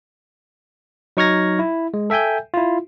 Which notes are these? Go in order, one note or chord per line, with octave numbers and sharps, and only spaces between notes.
F#3 D#4 C#6 F6 G#6 A#6
E4
G#3
A4 E5 G5 G#5 G6
E4 F4